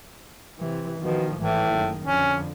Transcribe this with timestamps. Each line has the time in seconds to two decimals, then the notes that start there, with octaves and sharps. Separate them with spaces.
0.58 C3 E3
1.00 B2 D#3 F3
1.38 G#1 A2 E3
1.71 F#1 D#3
2.06 F2 D3 C#4